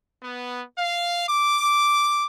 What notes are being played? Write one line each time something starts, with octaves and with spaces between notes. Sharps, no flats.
B3
F5
D6